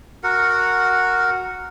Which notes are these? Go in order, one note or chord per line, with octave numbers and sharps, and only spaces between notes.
F#4 A#4 F#5